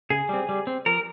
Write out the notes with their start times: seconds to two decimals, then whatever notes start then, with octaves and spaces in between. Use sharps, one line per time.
0.10 C#3 G#4
0.29 G3 C4
0.49 G3
0.67 C4
0.86 F3 A#4